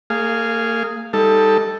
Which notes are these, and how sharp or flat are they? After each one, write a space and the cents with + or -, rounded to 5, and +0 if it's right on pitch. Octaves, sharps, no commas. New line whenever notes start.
A#3 -40 G#4 +0 F5 -10
G3 +20 D#4 +25 A4 +0